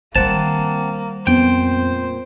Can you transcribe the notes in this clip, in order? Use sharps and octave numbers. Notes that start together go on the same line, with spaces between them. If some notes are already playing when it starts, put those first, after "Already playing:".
D#3 G3 A#3 C4 C5 F#5 A5
F2 A#2 B3 C4 C5 G5